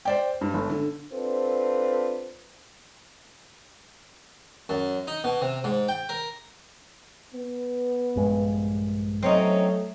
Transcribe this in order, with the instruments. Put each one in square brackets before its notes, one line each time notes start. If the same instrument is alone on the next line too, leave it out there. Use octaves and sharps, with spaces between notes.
[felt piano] C5 D5 G5
G2
G1
D3
[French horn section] C4 D4 F4 A4 B4 C5
[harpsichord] F#2
D#4
B2
C3
G#2
G5
A#4
[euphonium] B3
[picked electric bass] A#1 G2 G#3
[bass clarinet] F#3 [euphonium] A3 [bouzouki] C4 C#4 D#4